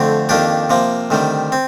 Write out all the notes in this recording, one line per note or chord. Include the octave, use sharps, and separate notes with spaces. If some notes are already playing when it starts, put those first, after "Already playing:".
Already playing: F2 D3 A3 C4
F2 D#3 A#3 D4 G4
C3 F3 A#3
D2 C3 D#3 G3
C4